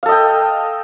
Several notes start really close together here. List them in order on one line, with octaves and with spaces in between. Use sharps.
F5 A4 D#5 G5